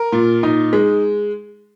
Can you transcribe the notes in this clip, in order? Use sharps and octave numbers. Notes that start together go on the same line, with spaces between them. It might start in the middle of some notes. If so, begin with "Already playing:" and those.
Already playing: A#4
A#2
D#4
G#3